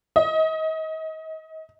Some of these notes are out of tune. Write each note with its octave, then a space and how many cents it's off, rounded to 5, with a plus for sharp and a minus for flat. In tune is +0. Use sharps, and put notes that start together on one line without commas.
D#5 +35